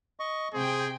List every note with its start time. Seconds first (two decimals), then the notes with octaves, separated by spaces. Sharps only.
0.20 D#5 C#6
0.54 C3 G#4 C5 G5